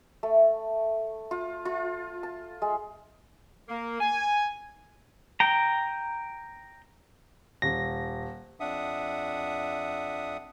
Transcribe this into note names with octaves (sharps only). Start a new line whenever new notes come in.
A3
F4
F4
A5
G#3
A#3
G#5
G5 A#5
D#1 A#6
F2 D4 E5 F#5 D#6